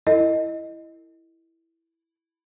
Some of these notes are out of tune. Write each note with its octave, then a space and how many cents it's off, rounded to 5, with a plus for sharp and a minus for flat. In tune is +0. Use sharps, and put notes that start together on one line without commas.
E4 +0 A4 +40 D#5 +0